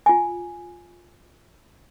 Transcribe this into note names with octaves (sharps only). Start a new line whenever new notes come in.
F4 G#5